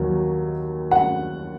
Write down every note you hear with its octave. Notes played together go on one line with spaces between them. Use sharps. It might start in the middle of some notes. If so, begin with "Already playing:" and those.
Already playing: D#2 D#3 F#3
F#5